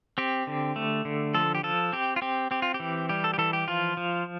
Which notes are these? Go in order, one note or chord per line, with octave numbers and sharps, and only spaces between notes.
C4 G4
D3
A3
D3
F3 A4
G4
F3 A4
C4 G4
F4
C4 G4
C4 G4
F4
G4
E3
G3 G4
A4
G4
E3 A4
G4
F3 F4
F3